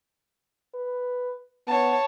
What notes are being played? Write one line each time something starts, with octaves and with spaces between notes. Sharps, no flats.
B4
B3 C#5 A5